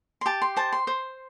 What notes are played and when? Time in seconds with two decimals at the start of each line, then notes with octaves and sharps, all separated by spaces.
0.21 C6
0.26 G4 A5
0.42 C6
0.57 C5 A5
0.73 C6
0.87 C5